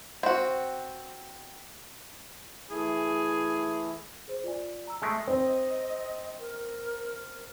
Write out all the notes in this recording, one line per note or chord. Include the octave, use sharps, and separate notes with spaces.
C4 F#4
E3 A3 E4 G#4
G#4 C5
F4 D5 G#5
A#5 E6
G#3 A3 G#5 C#7 D7
C4 D#5
A#4